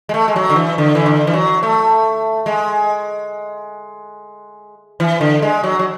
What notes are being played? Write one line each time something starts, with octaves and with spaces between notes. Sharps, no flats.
G#3
A3
G#3
F#3
D3
E3
D3
E3
D3
E3
F#3
A3
G#3
E3
D3
G#3
F#3
F#3